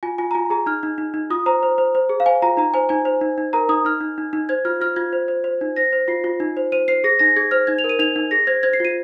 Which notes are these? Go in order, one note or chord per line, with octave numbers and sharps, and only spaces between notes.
F4 G#5
F4 G#5
A#5
F4 G#5
G#4 A#5
D#4 F6
D#4
D#4
D#4
F4 D#6
C5 A#5
C5
C5
C5
G#4
F5
C5 G#5
F4 A#5
D#4 A#5
C5 G#5
D#4 G#5
C5
D#4
D#4
A#4 A#5
D#4 D#6
D#4 F6
D#4
D#4
D#4
C5 G#6
F4 F6
F4 F6
F4 G#6
C5
C5
C5
D#4
C5 A#6
C5
F4 C7
F4
D#4
C5
C5 D#7
C5 C7
G#4 A#6
D#4 A#6
G#4 G#6
C5 F6
D#4 G#6
F7
A#4
D#7
D#4 F7
D#4
G#4 A#6
C5 G#6
C5 G#6
C7
F4 D#7